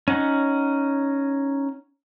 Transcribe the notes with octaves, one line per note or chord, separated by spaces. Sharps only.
C#4 D#4 F#5